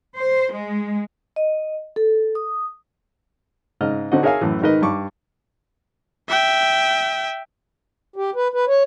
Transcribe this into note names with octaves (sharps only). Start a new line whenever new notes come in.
C5
G#3
D#5
A4
D#6
G#2 C#3 D#5 F6
D3 C4 D#4 F#4 D#5
G#4 A#4 C#5 E5 F5 G#5
F#2 A2 E3
G#2 D#3 D#4 A#4 B4 D#5
G2 B5 C#6 D6
E5 G5
G4
B4
B4
C#5